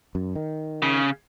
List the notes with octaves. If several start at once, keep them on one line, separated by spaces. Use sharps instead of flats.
F#2
D#3
C#3